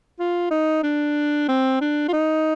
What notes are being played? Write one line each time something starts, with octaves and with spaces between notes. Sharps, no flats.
F4
D#4
D4
C4
D4
F4
D#4